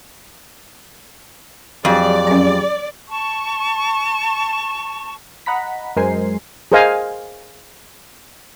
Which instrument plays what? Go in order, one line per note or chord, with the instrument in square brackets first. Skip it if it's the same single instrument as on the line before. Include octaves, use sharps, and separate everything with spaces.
[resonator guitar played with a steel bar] F2 [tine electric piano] F#3 G4 G#4 [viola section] D5
[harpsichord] F#2 A#5
[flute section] A5 C#6
[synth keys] D#5 F#5 A#5 B5 B6
F#2 G#3 A#4 C5 G#5 C7
[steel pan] G#4 A#4 C5 D#5 F5 G#5